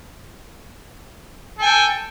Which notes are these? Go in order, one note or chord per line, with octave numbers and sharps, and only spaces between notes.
A4 G5 G#5